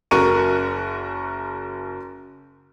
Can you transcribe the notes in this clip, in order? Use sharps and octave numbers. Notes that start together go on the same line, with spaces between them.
F#1 F#4 A#4 C#6 D#7